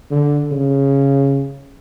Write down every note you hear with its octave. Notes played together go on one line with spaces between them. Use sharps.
D3
C#3